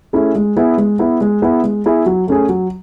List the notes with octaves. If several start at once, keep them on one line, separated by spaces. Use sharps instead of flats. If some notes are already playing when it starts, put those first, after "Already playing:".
A3 C#4 E4 G#4
G#3
B3 E4 G#4
G#3
B3 E4 G#4
G#3
B3 E4 G#4
G#3
B3 E4 G#4
F#3
A3 C#4 G#4
F#3